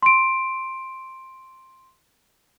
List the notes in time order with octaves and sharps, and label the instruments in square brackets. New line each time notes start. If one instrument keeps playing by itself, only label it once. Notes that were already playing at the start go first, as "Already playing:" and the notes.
[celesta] C6 D7